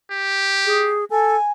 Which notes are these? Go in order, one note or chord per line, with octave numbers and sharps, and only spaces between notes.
G4
G#4
A4 G#5